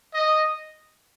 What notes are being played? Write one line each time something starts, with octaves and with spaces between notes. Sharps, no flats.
D#5